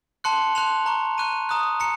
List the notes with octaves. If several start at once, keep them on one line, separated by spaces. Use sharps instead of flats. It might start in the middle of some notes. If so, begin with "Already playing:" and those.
A5 C6 F#6 C#7
A5 C6 F#6 F7
A#5 C#6 F#6
A#5 C#6 F#6 D#7
A#5 D#6 F#6
A#5 C#7